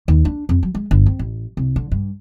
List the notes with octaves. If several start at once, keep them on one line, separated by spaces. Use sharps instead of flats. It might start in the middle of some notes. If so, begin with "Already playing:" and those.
D#2
D4
F2
F#3
G#3
G1
C4
A1
C2
D3
G2